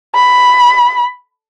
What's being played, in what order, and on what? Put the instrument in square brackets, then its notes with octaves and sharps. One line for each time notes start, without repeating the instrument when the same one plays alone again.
[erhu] B5